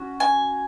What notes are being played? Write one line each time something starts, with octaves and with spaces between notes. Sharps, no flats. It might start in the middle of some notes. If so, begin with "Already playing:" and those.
Already playing: C#4 F#4
G#5